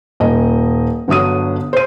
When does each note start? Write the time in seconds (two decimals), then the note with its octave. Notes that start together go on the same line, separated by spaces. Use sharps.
0.20 D#1 D#5
1.08 G1 D3 F#3 D#6 D#7
1.73 C5 D#7